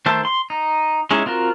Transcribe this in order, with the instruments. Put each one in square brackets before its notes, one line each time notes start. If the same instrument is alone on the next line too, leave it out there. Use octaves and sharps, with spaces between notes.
[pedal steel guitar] D#3 A3 C5 E5 A5
C6
D#4
G#3 C#4 D#4 E4
C4 F4 F#4 A#4